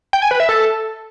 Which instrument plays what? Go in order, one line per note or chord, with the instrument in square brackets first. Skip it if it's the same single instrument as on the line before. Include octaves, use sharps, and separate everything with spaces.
[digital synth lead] G5
G#5
B4
E5
A4